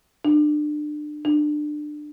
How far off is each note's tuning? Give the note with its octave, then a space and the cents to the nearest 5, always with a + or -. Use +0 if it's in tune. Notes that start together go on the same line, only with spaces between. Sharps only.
D4 +30
D4 +25